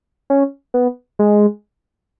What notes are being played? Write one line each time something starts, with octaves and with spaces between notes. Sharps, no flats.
C#4
B3
G#3